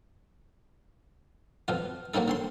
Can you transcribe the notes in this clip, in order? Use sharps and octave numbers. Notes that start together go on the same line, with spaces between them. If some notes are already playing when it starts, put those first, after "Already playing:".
F2 B2 F4
F#3 A#3 C4 D#4 A4
D3 C4 C6